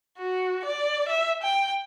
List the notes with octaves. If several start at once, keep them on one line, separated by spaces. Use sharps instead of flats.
F#4
D5
E5
G5